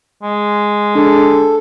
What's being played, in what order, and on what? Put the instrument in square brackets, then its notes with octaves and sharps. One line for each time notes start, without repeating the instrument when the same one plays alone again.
[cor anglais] G#3
[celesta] D4 G#4 [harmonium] A4